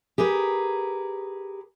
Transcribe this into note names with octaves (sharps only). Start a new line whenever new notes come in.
G4 G#4 A#4 B4